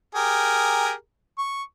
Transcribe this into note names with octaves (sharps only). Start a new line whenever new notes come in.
G4 G#4 A#4
C#6